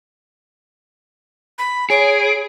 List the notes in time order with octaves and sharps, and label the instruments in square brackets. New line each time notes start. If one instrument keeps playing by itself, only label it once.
[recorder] B5
[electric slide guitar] G#4 [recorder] C#5 [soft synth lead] D7